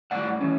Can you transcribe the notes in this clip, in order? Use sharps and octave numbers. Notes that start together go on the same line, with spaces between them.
A2 E3 G3 D5 F#5
E3 A3 C#4